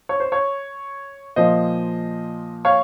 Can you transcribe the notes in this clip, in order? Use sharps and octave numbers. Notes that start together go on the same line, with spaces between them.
C#5
C5
C#5
A#2 F3 C5 D#5
C#5 F5